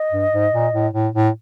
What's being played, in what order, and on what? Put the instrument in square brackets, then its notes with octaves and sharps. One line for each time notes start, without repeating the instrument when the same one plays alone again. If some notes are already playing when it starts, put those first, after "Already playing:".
Already playing: [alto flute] D#5
[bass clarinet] G2
G#2
A#2
A2
A2
A2